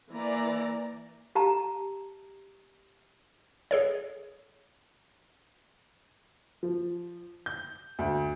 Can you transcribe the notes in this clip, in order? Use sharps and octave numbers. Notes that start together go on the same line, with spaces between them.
E3 A#3 D5 A#5
G4 A5 A#5
G#4 A4 C#5
F3
G6
D2